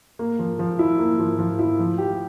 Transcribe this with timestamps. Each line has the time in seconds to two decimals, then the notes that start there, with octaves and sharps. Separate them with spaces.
0.19 A#3
0.39 F3
0.59 F3
0.79 E4
0.99 A#3
1.20 F3
1.39 F3
1.59 E4
1.79 F3
1.98 G4